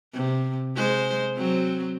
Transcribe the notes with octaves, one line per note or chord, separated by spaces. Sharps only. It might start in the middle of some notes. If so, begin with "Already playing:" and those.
C3
G#3 C5
F#3 C4